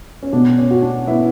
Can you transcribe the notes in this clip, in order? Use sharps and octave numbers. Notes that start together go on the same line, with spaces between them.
C#4
B2 D4
C#4
F#4
D4
B3 E4